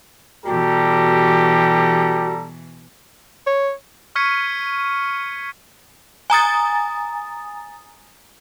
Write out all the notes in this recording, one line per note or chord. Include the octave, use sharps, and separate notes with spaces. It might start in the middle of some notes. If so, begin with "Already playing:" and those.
B2 E3 G3 F#4 G4 A4 A#5
C#5
C#6 F6 G#6 B6 C#7 D#7
G#5 A#5 D#6 A6